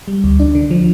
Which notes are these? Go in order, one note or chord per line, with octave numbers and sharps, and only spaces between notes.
G3
D2
D4
D3
F3